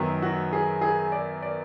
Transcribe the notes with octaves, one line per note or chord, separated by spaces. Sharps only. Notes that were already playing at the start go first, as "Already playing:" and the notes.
Already playing: F#2 D#3 F#3 B3
F#4
G#4
G#4
D5
D5